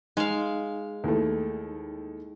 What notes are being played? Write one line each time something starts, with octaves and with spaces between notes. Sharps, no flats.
G#3 D#4 F5
D#2 E3 A3